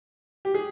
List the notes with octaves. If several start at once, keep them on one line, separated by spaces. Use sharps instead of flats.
G4
G#4